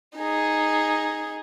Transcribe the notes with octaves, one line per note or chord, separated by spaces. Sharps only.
D#4 G#4